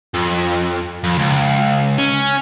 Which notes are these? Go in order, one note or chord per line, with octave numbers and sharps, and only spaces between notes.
F2
F2
C#2
C#4